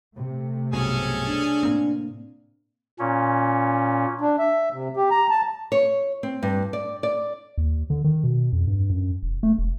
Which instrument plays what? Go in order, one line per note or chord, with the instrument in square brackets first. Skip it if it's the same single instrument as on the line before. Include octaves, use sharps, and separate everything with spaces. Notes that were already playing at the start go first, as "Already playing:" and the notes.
[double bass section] C3 A3
[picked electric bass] B1 G2 B2 [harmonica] C#4 G#4 A4
[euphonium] D4
[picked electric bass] A2 A#3 C4
[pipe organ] A#2 C#4
[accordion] D4
E5
C3
G4
A#5
A5
[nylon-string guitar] C#5
C4
G2
D5
D5
[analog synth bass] D#2
D3
D#3
B2
F2
G2
F#2
E1
A3
E1